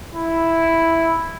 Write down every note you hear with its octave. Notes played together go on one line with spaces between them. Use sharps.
E4